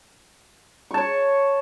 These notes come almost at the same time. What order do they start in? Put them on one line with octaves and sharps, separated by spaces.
C#6 A5 C#5